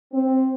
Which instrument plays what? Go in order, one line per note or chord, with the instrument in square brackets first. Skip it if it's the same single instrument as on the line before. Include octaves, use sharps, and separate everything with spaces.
[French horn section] C4